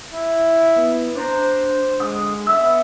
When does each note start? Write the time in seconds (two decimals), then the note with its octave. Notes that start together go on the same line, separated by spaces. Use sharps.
0.13 E4
0.76 B3
1.15 D4 C5 A#5
2.00 D3 G#3 F#5 D#6
2.47 B3 E5 E6